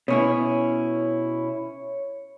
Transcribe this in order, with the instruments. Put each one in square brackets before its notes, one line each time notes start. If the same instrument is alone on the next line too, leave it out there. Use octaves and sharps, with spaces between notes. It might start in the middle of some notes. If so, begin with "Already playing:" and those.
[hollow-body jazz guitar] B2 C#4 E4 [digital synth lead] C#5